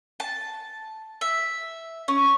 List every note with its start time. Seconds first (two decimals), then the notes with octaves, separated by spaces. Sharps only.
0.20 A5
1.21 E5
2.08 C#4